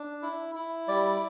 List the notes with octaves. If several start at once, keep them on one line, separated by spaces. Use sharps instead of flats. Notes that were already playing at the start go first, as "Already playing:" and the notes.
Already playing: D4
E4
E4
G3 D5